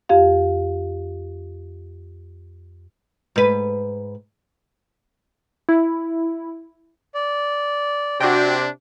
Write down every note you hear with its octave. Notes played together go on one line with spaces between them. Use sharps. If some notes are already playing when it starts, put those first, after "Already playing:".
F2 G4 F5
G#2 B4
E4
D5
C3 D4 F#4 G5